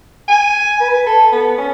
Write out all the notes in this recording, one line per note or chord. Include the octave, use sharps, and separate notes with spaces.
G#5
B4
A4
B3
C#4